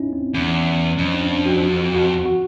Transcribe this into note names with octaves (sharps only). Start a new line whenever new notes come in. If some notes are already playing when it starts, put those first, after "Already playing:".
Already playing: C#4 D#4 E4
C4
E2 C#4
F2 C#4
D4
D4
F#4
F#4
F#4
F#4